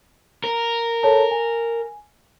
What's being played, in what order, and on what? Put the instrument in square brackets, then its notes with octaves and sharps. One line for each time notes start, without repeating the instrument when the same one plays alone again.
[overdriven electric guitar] A#4
[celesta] A4 C#5 A5
G#5